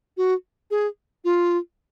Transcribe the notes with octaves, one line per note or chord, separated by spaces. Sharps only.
F#4
G#4
F4